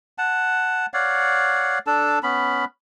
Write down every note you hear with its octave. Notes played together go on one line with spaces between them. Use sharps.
F#5 A5
C#5 D5 F5 F#5
D4 A4 A5
B3 C#4 B5